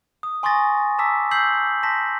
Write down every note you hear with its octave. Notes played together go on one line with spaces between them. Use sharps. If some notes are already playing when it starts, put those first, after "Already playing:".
D#6
G#5 C6 C#6 D#6 A6 A#6
A5 A#5 D6 E6 B6
E6 G6 B6 C7 F#7
A5 C6 A#6 B6